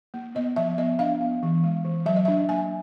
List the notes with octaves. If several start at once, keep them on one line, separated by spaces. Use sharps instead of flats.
A#3
B3 D#5
F3 E5
B3 D#5
D4 F5
B3
E3
G#3
E3
F#3 E5
D#5
D4 E5
A#3 G#5